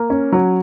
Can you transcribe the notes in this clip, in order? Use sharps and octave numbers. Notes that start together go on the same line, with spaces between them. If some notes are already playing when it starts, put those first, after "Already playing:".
Already playing: A#3
C#4
F#3